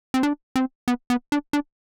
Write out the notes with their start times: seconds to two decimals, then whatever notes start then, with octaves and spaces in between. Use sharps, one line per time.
0.14 C4
0.23 D4
0.56 C4
0.88 B3
1.10 B3
1.32 D4
1.53 D4